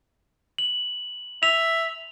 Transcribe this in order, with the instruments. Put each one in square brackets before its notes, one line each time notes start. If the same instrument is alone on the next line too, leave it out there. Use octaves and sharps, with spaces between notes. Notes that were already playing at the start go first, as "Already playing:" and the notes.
[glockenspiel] F#7
[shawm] E5 [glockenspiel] F7